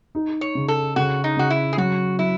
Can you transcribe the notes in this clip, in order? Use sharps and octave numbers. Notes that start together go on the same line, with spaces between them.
D#4
C#5
C#3
A4
C#3 F#4
D#4
C#3 F#4
E4
G#4
F#3 F#4
F#3 E4